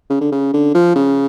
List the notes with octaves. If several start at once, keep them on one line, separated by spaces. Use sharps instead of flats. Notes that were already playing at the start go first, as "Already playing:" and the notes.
C#3
D3
C#3
D3
F3
C#3